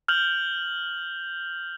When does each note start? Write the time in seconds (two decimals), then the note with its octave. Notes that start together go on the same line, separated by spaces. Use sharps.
0.08 F6 G6 F7 F#7